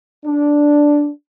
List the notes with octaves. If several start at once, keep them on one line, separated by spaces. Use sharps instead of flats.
D4